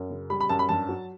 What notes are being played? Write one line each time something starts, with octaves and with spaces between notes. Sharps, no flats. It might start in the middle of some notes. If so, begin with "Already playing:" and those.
Already playing: F#2
C#3
G3 B5
B5
F#2 A5
B5
G2 A5
F#3